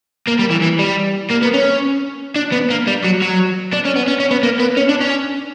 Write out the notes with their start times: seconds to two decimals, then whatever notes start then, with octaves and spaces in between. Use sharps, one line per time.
0.28 A#3
0.40 G3
0.51 E3
0.62 E3
0.79 G3
1.31 A#3
1.43 B3
1.54 C#4
2.36 D4
2.52 B3
2.70 A#3
2.87 G3
3.04 F#3
3.22 F#3
3.73 D4
3.85 C#4
3.96 B3
4.08 C#4
4.20 C#4
4.31 B3
4.43 A#3
4.59 B3
4.77 C#4
4.89 D4
5.01 C#4